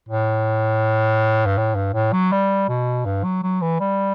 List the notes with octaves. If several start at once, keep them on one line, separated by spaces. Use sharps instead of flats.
A2
G2
A2
G2
A2
F#3
G3
B2
G2
F#3
F#3
E3
G3